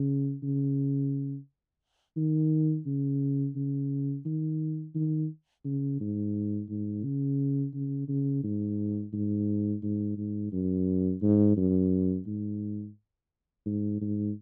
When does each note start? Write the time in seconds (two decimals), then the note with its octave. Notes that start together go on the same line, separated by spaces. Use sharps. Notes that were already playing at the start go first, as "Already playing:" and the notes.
Already playing: C#3
0.43 C#3
2.17 D#3
2.86 C#3
3.56 C#3
4.25 D#3
4.95 D#3
5.64 C#3
6.00 G#2
6.69 G#2
7.04 C#3
7.74 C#3
8.08 C#3
8.44 G#2
9.13 G#2
9.82 G#2
10.17 G#2
10.52 F#2
11.22 G#2
11.57 F#2
12.27 G#2
13.66 G#2
14.01 G#2